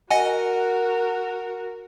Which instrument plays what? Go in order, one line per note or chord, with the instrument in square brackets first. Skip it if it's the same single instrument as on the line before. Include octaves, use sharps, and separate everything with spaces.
[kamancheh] F#4 A#4 [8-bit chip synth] D#5 F#5 G#5